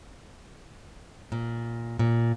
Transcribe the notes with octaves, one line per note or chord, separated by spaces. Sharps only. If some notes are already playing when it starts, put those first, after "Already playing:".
A#2
A#2